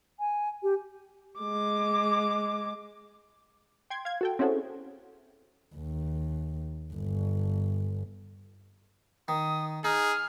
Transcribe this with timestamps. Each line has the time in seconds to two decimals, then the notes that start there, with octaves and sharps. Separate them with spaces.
0.20 G#5
0.63 G4
1.39 G#3 D6
3.90 G5 C6 G#6
4.05 F5 G#6
4.21 F#4 A4 G5
4.39 C4 C#4 E4 F#4 G#4 A4
5.76 D#2
6.93 G1
9.28 D#3 D#6
9.84 D#4 G#4 F6